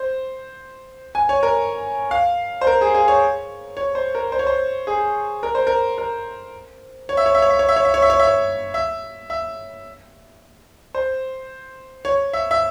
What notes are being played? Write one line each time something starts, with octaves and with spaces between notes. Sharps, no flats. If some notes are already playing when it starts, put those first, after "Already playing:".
Already playing: C5
G#5
C#5
A#4
F5
C5
A#4
G#4
G#4
C#5
C#5
C5
A#4
C5
C#5
C5
G#4
A#4
C5
A#4
A#4
C#5
E5
C#5
E5
C#5
E5
C#5
E5
C#5
E5
C#5
E5
C#5
E5
C#5
E5
E5
C5
C#5
E5
E5